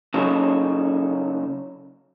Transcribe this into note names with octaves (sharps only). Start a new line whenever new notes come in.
C#3 F#3 D#4 A4 C#5